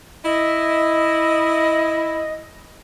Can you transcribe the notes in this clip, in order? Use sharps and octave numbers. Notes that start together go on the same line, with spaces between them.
E4 D#5